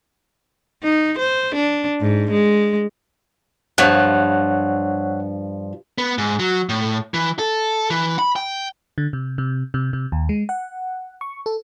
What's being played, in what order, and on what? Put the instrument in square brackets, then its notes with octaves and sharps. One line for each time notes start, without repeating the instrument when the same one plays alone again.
[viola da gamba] D#4
C5
D4
G#2
G#3
[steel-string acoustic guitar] G2 F3 [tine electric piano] C#5 F#5 F#6
[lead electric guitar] B3
G#2
F#3
A2
E3
A4
E3
B5
G5
[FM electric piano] D3
C3
C3
C3
C3
D#2
G#3
F#5
C#6
A4